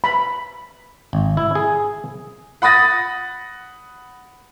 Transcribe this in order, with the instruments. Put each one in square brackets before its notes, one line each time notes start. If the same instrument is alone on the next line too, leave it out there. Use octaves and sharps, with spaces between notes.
[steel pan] B5
[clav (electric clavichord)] G#1
E4
G#4
[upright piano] F#5 B5 D#6 A6 A#6